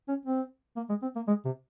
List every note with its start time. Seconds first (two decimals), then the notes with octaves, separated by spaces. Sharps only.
0.08 C#4
0.26 C4
0.77 A#3
0.89 G#3
1.02 C4
1.16 A#3
1.28 G#3
1.45 C3